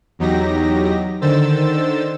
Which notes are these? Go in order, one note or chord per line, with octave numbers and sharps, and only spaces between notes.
E2 F#3 D#4 G4 A#6
D3 D#3 C5 E6 A6